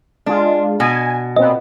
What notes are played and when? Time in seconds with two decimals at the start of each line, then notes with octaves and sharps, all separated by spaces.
0.26 G#3 D4 F4
0.80 B2 G#5
1.36 A#2 B3 C4 D#5